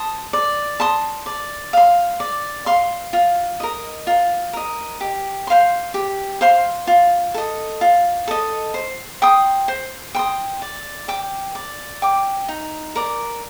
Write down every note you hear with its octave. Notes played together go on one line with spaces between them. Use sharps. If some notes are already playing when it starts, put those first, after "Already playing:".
Already playing: A5 C6 D#6
D5
A5 C6 D#6
D5
F5 C6
D5
F5 C6
F4
A#4 D#5
F4
A#4 D#5
G4
C5 F5 C6
G4
C5 F5 C6
F4
A4 D#5
F4
A4 D#5
C5
G5 C6 D#6
C5
G5 C6 D#6
D5
G5 D6
D5
G5 D6
D#4
A#4 D5